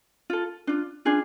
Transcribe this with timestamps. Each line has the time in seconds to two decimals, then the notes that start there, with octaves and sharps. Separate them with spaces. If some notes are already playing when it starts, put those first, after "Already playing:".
0.30 F4 A4
0.67 D4 F4
1.05 D4 F4 G#4